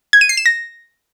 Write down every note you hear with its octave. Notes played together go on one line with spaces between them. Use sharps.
G#6
D#7
C7
E7
A#6